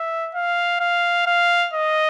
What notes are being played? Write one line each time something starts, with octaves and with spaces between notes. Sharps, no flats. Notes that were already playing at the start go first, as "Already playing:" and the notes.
Already playing: E5
F5
F5
F5
D#5